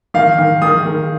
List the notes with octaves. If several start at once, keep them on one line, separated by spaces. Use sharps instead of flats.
D#3 F5
D#3
D#3 D#6
D#3